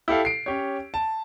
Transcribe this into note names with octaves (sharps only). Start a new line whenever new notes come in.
E4 G4 A4 F5
C7 D7
C#4 G4 C#5
A5